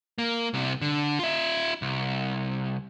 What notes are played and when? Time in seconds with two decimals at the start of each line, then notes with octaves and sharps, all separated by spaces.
0.18 A#3
0.54 C2 C3
0.81 D3
1.19 F4 E5
1.82 C2